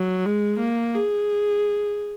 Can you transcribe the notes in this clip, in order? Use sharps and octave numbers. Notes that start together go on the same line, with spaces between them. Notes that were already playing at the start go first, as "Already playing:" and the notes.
Already playing: F#3
G#3
A#3
G#4